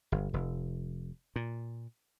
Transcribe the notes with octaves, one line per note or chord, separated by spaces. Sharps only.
G1
F1
A#2